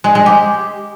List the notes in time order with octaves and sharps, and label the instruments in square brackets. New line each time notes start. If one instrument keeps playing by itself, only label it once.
[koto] G#3
G#3
G4